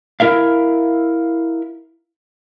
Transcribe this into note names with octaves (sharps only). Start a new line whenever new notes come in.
E4 A#4 E5 F5